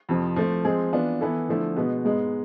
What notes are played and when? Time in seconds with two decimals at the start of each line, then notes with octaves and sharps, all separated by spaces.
0.09 F2 C3 F3
0.36 F3 A3 C4
0.65 F3 G#3 C4 G#4
0.93 E3 B3 D4 F4
1.21 E3 B3 E4 A4
1.49 D3 F3 A3 E4
1.77 B2 G#3 B3
2.05 G#2 G#3 B3